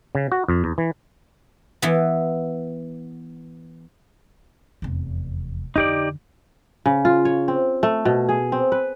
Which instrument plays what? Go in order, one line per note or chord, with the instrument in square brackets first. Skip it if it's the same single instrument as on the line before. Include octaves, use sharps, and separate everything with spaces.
[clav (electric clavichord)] C#3
F#4
F2
E2
E3
[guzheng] E3 B3
[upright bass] F1 E2
[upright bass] F2 D3 [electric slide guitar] D#4 G4 D5
[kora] C#3
F4
C#5
C4
A3
B2
G#4
C4
B4